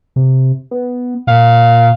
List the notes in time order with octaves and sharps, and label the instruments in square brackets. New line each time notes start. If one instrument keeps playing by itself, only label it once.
[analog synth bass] C3
B3
[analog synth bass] A#2 [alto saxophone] F5
[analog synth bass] A#2